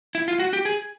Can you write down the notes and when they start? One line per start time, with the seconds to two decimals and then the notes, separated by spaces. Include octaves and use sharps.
0.15 E4
0.28 F4
0.40 F#4
0.53 G4
0.65 G#4